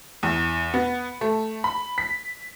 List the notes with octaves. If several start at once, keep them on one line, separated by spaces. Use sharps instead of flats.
E2
B3
A3
B5
B6